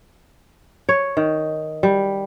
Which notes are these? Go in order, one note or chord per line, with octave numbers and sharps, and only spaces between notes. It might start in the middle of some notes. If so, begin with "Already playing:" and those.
C#5
D#3
G3